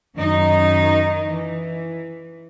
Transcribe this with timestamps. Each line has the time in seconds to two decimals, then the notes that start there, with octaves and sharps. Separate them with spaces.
0.16 F#2 D#3 D#4
1.30 E3